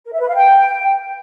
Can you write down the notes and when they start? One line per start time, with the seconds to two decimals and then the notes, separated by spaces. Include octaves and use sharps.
0.05 A#4
0.12 E5
0.20 B4
0.27 F5
0.35 G5